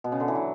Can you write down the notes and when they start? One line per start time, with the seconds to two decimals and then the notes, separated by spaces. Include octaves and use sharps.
0.04 B2
0.12 C#3
0.20 D3
0.28 E3
0.35 F#3